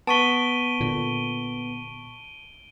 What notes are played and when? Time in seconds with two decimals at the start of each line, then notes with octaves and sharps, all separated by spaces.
0.07 B3 A5 C#6 B6 D7 D#7 G7
0.80 A#2 D3